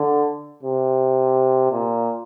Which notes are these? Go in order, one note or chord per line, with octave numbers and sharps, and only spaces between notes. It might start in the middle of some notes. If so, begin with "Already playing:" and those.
Already playing: D3
C3
A#2